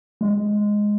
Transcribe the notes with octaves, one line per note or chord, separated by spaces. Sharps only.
G#3